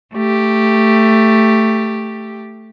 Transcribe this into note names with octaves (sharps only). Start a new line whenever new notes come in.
A3 G4